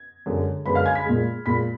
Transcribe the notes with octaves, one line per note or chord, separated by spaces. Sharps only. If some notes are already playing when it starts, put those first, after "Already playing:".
Already playing: G#6
F#2 D3 G#3
F#2 D3 G#3 B4 B5
F5 F6
G#5 G#6
B5 B6
A#2 G#3
A#2 G#3 B5 B6